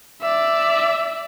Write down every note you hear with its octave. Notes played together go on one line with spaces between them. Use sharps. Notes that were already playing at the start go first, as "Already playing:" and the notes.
D5 E5